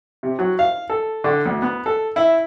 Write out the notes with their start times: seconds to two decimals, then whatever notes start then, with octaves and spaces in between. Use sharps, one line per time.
0.23 C3
0.39 F#3
0.59 F5
0.90 A4
1.24 D3
1.46 D2
1.62 B3
1.86 A4
2.16 E4